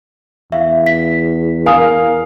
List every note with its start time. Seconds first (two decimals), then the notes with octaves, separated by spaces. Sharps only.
0.52 E2 E5 F5
0.86 B6
1.66 A#4 F5 G#5 D#6